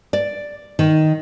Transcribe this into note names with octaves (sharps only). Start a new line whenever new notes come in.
D5
D#3